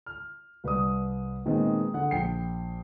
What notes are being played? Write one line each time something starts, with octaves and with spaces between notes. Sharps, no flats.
F6
C2 B4 D5 D#6
A#2 D#3 G#3 B3 C4
D3 F#5
A#1 G5 C7